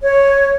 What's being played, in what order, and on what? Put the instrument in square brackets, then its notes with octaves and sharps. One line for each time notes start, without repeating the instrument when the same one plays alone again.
[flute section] C#5